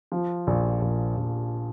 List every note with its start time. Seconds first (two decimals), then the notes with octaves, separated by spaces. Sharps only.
0.12 F3
0.47 A#1
0.82 A#1
1.17 A#1